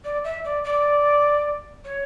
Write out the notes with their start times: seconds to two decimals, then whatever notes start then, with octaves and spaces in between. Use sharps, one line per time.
0.04 D5
0.24 E5
0.45 D5
0.64 D5
1.84 C#5